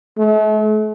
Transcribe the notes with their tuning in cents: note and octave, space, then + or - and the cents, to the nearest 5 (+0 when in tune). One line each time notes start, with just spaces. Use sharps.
A3 -40